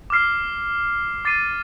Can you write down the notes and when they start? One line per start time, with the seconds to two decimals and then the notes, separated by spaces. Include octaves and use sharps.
0.10 D6 F6 C7
1.25 D6 A6 C7 D#7